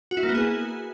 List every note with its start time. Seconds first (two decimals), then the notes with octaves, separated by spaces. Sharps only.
0.11 F#4
0.17 E4
0.23 A#3
0.29 B3
0.35 G#4